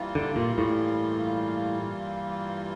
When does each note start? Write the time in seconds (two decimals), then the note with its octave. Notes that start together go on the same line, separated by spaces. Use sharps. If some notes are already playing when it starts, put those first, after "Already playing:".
Already playing: G2 E3 G3 A#3 F4
0.15 D3
0.36 A#2
0.58 A2